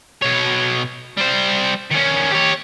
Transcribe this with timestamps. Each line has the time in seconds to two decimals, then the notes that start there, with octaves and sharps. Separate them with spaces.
0.22 B2 C#5
1.17 G3 C5
1.91 D#3 C#4
2.31 G4 C#5